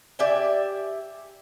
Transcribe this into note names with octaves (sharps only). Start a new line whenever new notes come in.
G4 D5 E5 G#5